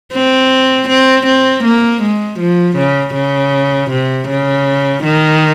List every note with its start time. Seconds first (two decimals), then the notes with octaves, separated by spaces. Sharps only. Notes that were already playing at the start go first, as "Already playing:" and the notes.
0.13 C4
0.89 C4
1.27 C4
1.64 A#3
2.02 G#3
2.40 F3
2.77 C#3
3.14 C#3
3.91 C3
4.28 C#3
5.04 D#3